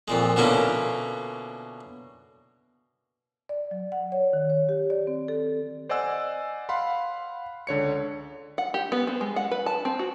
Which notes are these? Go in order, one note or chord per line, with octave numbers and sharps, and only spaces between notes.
F2 A#2 G#3
B2 D3 A#3 C#4 E4 F4
D5
F#3
F#5
C#5
D#3
C#5
G4
D5
C4
A4
C5 D5 D#5 F#5 G#5 E6
F5 F#5 B5 C6
C#2 D3 C#5 C#7
F#5
G4
B3
C4
G#3
F#5
B4
A5
C4
F#4